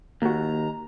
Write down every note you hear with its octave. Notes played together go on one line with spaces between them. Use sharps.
D#2 A#3 F#4 A#5